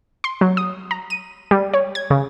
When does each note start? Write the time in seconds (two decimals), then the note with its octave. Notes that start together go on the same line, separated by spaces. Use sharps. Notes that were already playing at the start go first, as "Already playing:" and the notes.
0.24 C6
0.41 F#3
0.57 D#6
0.91 A#5
1.10 D#7
1.51 G3
1.74 C#5
1.95 G#6
2.10 C#3